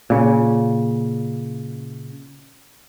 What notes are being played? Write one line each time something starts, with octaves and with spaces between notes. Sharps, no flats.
A#2 C#3